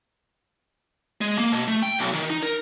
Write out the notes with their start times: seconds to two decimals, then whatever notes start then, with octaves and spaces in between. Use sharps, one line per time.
1.21 G#3
1.38 A#3
1.52 B2
1.68 A3
1.83 G5
1.99 B1
2.13 D#3
2.30 D#4
2.42 A#4